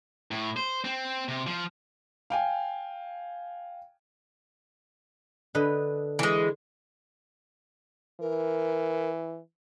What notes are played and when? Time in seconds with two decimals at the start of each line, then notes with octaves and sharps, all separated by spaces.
0.31 A2
0.57 C5
0.85 C4
1.28 C3
1.47 F3
2.30 F5 G5 G#5
5.55 D3 B4 D#5
6.19 E3 G#3
8.20 E3 A#4